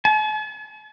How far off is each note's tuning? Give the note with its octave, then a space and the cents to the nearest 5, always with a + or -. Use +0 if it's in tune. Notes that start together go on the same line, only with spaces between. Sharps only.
A5 -45